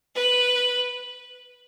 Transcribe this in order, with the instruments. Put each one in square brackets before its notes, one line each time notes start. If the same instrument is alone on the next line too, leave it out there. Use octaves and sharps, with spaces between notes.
[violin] B4